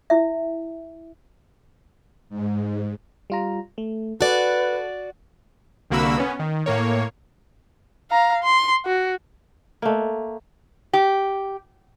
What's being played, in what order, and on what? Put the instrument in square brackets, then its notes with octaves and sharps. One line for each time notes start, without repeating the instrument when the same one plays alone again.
[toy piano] E4 E5
[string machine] G#2
[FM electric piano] G3 F4 A#5
A3
[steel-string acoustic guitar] F#4 D5 [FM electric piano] A4 [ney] B4
[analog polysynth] C2 D3 A#3 F#4 B5 E6
B3 C#4
D#3
A2 A#3 C#5
[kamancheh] F5 A#5
C6
F#4
[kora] A3 A#3
[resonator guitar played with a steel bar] G4